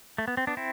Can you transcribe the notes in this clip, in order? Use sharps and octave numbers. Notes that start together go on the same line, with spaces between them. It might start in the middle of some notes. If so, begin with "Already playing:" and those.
A3
B3
C4
B3 D4
C4 E4